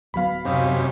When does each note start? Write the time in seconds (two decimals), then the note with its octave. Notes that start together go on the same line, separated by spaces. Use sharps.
0.14 D1 F#3 B3 F5 B5
0.45 F#2 C3 C#4 D#4 G4